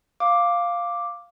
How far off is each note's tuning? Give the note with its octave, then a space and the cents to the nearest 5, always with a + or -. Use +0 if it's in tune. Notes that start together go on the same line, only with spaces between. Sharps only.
F5 +0 D6 +0